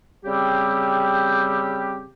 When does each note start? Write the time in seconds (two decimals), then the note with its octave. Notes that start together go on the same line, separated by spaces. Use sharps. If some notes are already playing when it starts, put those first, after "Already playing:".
0.24 C#3 G3 C4 G4